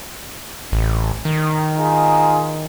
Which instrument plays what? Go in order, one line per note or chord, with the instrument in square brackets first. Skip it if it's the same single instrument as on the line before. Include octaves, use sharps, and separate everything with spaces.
[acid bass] A1
D#3
[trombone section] D#4 F4 G#4